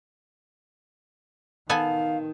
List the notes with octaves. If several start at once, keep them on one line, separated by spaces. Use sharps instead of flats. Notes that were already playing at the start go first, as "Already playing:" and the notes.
D#3 B3 A4 F5 G#5